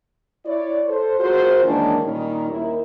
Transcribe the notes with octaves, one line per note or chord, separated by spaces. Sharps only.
E4 C#5 D5
A4 C5
F4 F#4 G#4 A#4 C5
D#3 E3 G#3 A#3 C#4 D4
A#2 D#3 G3 C#4 D#4
D#2 E4 A#4